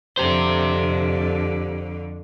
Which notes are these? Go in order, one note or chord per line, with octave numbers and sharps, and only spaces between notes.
F2 D3 G4 C5